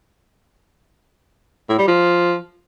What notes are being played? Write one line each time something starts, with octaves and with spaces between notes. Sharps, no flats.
A2
G3
F3